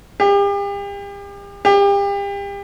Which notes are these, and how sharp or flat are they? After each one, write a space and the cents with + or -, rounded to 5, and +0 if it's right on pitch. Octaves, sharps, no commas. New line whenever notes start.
G4 +40
G4 +35